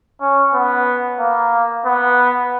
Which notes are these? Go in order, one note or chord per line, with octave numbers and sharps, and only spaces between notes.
C#4
B3
A#3
B3